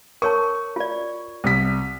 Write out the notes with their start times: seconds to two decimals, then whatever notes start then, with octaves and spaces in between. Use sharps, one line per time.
0.22 A#4 C#5 A5 C#6
0.76 F4 D5
1.44 C2 B6